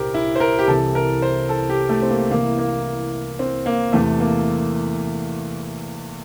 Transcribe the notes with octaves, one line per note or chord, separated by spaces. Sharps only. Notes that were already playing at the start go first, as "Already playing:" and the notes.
Already playing: C2 A#2 G4 A#4 C5
E4
C5
A#4
G4
C2 C3 E3 A4
A#4
C5
A4
G4
A3
C4
A#3
C2 C3 E3 A#3
A#3
C4
A#3
E2 C3 E3 A3
A#3